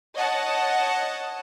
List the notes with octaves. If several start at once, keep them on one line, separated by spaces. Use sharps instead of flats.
C#5 D#5 F#5 A5